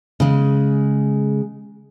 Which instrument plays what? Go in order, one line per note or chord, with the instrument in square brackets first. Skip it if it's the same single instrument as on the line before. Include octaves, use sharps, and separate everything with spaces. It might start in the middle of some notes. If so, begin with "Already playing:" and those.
[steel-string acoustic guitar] C#3 G#3